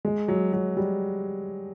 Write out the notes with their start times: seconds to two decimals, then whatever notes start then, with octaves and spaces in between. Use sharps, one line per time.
0.05 G#3
0.28 F#3
0.53 F#3
0.77 G3